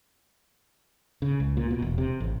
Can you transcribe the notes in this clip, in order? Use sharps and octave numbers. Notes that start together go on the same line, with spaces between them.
C#3
C#2
A#2
B2
E1
C3
A1